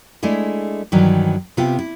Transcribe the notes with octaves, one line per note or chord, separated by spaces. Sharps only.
G#3 A3 D4 E4 G#4
G2 D#3 E3 F#3
C3 B3 F4 G4
E4